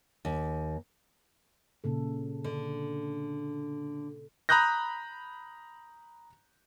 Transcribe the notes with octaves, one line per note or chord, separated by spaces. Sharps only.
D#2
A#2 C#3 A4
D3
A#5 B5 D#6 F#6 G6 A#6